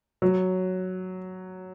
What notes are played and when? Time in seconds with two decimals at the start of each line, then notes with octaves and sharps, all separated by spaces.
0.22 F#3